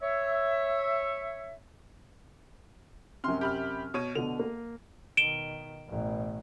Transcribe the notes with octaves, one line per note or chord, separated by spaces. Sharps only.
C#5 E5
F#2 C3 C6 F6
G4 B5 F6
B2 C#5 D#7
B2 D3 F7
A#3
B2 D#3 D7 E7 G7
A1 B2